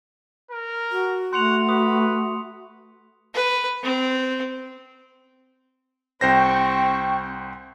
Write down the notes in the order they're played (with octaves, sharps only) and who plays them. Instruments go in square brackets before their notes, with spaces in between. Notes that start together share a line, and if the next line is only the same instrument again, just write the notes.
[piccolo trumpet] A#4
[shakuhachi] F#4
[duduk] A3 [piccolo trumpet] F#5 [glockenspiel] C6 C#7 F7
[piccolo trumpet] B4 [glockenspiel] D#6
[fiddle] B4
C4
[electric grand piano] C2 C5 A#6 [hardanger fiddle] C4 [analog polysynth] G5 C#6